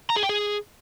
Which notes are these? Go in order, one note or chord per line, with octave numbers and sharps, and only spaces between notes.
A#5
G#4
G5
G#4